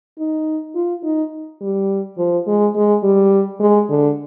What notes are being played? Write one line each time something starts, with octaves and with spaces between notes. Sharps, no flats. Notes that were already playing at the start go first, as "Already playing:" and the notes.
D#4
F4
D#4
G3
F3
G#3
G#3
G3
G#3
D3